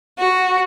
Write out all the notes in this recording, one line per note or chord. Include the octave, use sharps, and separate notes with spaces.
F#4